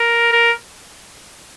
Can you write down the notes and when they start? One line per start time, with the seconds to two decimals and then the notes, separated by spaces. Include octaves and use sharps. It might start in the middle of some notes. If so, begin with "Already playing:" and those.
Already playing: A#4
0.32 A#4